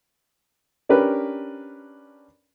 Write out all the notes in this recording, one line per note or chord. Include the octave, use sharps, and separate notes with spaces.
C#4 D4 G4 A#4 B4